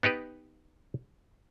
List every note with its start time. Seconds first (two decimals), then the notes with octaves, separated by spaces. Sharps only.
0.03 B3 D#4 G4 B4